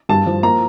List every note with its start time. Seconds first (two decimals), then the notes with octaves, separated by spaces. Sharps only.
0.09 G2 A5
0.26 F3
0.43 A#3 A#5